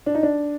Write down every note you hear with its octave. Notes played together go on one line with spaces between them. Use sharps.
D4
D#4
D4